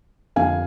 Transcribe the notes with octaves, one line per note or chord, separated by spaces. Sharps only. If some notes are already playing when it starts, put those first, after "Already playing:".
F2 D3 F3 F5 G#5